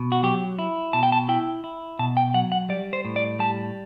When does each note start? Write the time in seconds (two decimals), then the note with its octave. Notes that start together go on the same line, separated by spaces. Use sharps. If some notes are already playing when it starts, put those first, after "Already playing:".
Already playing: B2
0.12 F#4
0.23 F#3 G4
0.59 E4
0.93 B2 A5
1.03 G5
1.12 A5
1.29 E4 G5
1.64 E4
1.99 B2 A5
2.17 G5
2.34 F#3 F#5
2.52 F#5
2.69 G3 D5
2.93 C5
3.05 A2
3.16 D5
3.39 G3 A5